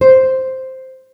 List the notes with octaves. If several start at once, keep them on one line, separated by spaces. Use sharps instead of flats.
C5